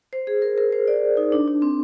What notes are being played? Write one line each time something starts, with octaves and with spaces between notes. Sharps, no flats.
C5
G#4
A#4
A#4
C5
D5
D#4
D4
D4
C4